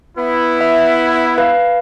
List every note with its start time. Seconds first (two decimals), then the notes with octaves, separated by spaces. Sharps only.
0.17 B3 E4
0.61 E5
1.38 B4 F5